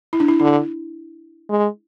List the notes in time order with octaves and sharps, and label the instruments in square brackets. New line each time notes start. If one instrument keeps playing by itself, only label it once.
[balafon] E4
D4
E4
[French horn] D3 [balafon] E4
[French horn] G#3